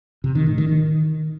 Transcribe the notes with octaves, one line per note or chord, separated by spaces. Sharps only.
C3
D#3
A2
D#3
D#3